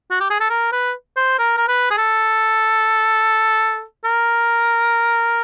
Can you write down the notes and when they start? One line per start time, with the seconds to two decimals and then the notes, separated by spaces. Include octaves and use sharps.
0.11 F#4
0.20 G4
0.30 G#4
0.40 A4
0.50 A#4
0.72 B4
1.16 C5
1.39 A#4
1.57 A#4
1.68 B4
1.90 G#4
1.97 A4
4.05 A#4